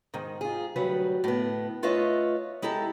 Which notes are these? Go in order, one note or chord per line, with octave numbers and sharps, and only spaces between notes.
G#2 D#3
F4 G#4
D2 F#3 G3 B4
A2 B3
A3 F4 B4 C#5 D#5 E5
G#3 E4 G4 A4 A#5